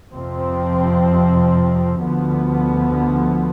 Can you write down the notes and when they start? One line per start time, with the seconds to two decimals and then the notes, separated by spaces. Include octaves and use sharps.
0.12 F2 C3 F3 C4
2.01 D2 D3 F3 B3